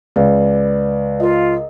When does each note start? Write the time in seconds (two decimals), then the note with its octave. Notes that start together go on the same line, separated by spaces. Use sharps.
0.16 C#2 B4 D5
1.20 F4 A#4 D#5